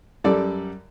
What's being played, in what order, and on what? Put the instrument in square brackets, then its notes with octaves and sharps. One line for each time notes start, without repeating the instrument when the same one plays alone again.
[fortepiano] F#2 G3 A4 D5